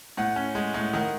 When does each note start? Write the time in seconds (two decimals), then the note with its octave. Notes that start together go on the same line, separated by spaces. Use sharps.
0.17 A2 F#5
0.36 C#4
0.55 G#3
0.74 A2
0.93 D#3 F#5